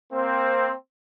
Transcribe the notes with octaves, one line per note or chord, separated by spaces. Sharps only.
A#3 C4